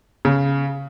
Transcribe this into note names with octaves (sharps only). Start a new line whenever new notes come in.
C#3